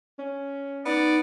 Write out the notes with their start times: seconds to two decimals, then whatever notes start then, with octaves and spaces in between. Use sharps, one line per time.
0.19 C#4
0.86 B3 D#4 D5